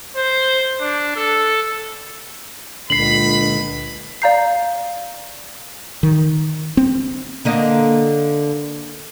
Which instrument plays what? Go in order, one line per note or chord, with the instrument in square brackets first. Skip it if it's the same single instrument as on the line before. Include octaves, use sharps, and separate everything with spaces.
[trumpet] C5
D4
A4
[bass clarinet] C#2 [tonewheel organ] A#2 D3 [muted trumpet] B5 [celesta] C7 F#7
[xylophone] D5 F5 A#5 G6 C7
[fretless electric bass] D#3
C4
[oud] D3 A#3 D#5